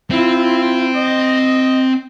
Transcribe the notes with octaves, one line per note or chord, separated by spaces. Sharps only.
C4 E4 F4
D#5